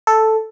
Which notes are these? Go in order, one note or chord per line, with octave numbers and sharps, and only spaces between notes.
A4